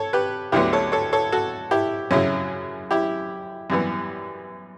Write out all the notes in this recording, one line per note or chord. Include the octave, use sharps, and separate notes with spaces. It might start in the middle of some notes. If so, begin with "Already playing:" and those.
Already playing: A4 C#5
G4 B4
D2 D3 F#3 B3 E4 G4
A4 C#5
A4 C#5
A4 C#5
F#4 A4
E4 G4
F#2 C#3 F#3 C#4 E4
E4 G4
F#2 E3 G3 B3